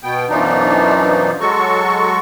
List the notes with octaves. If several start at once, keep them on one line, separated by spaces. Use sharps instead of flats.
B2 B3 G5
F#2 B2 E3 F3 D4 D#4
F#3 G#3 F#4 A4 C#6